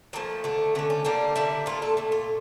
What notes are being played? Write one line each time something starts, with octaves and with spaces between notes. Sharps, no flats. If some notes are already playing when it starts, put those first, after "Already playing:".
A#2 F3 A3 A#3
D3 A3
D3 A3 C#4
C#4
D3 G3 A#3 D4
D3 G3 A#3 E4
A#2 A3 F4
A4
A#2 A3
F4